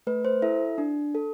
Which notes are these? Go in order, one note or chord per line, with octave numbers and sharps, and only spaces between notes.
A3 B4
C5
E4 A4 E5
D4
A4